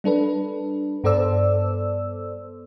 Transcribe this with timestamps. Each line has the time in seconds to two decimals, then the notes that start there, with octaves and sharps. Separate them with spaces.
0.04 G3 D4 A4 B4
1.04 G2 B3 A4 C5 D5 E6